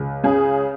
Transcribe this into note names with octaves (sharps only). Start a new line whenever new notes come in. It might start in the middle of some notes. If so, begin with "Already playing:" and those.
Already playing: C#2
C#3 G#4